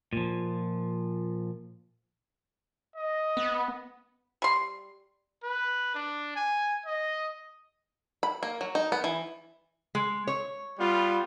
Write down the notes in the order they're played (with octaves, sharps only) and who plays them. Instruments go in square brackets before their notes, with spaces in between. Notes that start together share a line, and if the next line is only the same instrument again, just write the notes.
[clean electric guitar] A#2 F3
[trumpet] D#5
[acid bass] B3
[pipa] G3 C6
[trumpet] B4
D4
G#5
D#5
[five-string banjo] B5
A#3
F#3
D#4
B3
E3
[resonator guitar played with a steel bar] G#3
C#5
[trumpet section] G3 B3 F4